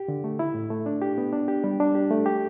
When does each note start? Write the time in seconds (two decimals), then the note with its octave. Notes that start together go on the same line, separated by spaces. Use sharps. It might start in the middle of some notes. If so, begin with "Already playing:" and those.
Already playing: G4
0.08 D3
0.24 A3
0.39 E4
0.55 A2
0.70 A3
0.86 D4
1.02 G4
1.18 B3
1.33 D4
1.48 G4
1.64 G3
1.80 D4
1.95 G4
2.11 A3
2.26 G4